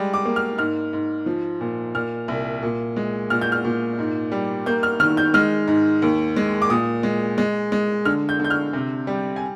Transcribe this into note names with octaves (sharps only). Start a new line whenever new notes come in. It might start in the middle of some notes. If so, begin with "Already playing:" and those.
Already playing: G3 G#3
D6
A#3
F6
G#2 F6
G#2
F3
A#2
A#2 F6
C2
A#2
G#3
A#2 F6
G6
F6
A#2
G#2
G3
A#3 G6
F6
D#3 F6
G6
G#3 F6
G#2
D#2
G#3
D6
A#2 D#6
G#3
G#3
G#3
D3 F6
G6
D3 G6
F6
C3
G3
G#5